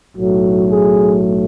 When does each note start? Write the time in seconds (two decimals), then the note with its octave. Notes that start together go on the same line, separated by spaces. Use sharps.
0.17 B1 A2 F#3 A3 F#4
0.69 G#4